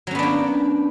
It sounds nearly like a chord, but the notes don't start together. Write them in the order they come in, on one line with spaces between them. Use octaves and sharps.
F#3 C#4 B3 D4 A#3